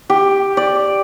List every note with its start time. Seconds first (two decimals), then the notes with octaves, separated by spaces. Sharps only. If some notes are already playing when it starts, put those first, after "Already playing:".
0.10 G4
0.57 D5